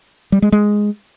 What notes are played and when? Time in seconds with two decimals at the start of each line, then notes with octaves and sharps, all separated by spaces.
0.32 G3
0.42 G#3
0.52 G#3